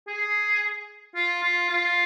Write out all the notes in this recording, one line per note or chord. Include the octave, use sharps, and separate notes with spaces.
G#4
F4
F4
F4